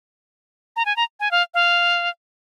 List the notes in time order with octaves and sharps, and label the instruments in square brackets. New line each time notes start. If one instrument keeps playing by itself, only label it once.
[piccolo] A#5
G#5
A#5
G#5
F5
F5